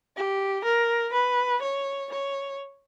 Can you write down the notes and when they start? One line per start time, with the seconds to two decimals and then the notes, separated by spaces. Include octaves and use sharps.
0.16 G4
0.64 A#4
1.13 B4
1.62 C#5
2.12 C#5